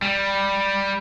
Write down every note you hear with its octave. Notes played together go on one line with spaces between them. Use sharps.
G3